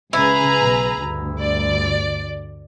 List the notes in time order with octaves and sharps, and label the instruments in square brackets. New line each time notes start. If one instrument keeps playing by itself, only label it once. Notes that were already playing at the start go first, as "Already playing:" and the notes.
[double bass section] C#2 C#3 C#4 [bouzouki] E4 [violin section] G#4 B4 A#5
[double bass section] B1
D2 G2
[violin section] D5